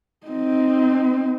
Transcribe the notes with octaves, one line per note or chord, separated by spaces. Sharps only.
C4 D#4